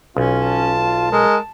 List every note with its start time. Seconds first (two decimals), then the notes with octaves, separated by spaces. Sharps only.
0.17 B1 C#4 F4
0.46 A5
1.12 G#3 A#4